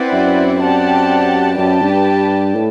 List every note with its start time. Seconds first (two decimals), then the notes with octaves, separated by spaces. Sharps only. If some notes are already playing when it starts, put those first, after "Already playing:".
Already playing: C4 E4 B4 D5 F#5
0.13 F#2
0.62 C4 G4 D5 F#5 A5
1.58 F#2 G4 B4 D5 A5
1.82 G2
2.55 A2